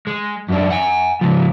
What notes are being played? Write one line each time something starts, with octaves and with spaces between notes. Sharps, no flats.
G#3
F#2 D4
F#5 G#5
C#2 F3